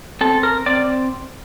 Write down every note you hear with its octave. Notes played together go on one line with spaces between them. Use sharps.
C4 A4
A#4
C4 D5